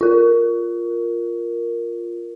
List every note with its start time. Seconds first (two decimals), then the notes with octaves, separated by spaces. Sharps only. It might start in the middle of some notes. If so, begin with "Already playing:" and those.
0.01 F4 A#4